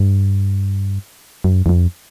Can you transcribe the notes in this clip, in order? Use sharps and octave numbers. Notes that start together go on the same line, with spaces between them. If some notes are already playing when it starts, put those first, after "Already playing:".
Already playing: G2
F#2
E2
F2